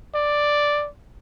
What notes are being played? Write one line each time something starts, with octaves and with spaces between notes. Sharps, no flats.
D5